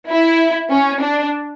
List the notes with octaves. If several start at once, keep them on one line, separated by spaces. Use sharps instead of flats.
E4
C#4
D4